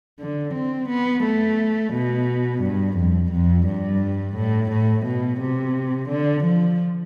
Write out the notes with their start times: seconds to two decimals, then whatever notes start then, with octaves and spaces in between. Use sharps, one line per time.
0.20 D3
0.54 C4
0.89 B3
1.24 A3
1.93 B2
2.63 G2
2.97 F2
3.32 F2
3.67 G2
4.37 A2
4.71 A2
5.06 B2
5.41 C3
6.09 D3
6.44 F3